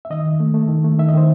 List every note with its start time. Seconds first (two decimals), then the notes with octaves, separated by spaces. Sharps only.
0.05 E5
0.10 D#3 D#5
0.26 D#3
0.40 A3
0.54 A3
0.69 D#3
0.84 A3
0.99 D#3 E5
1.09 D#5
1.14 D#3 C5